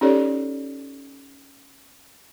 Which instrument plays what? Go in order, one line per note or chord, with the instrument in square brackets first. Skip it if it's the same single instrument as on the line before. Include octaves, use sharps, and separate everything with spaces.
[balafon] C#4 D#4 G4 A4 C#5 D5